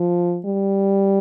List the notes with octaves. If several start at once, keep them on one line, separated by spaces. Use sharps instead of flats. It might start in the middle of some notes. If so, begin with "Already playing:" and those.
Already playing: F3
G3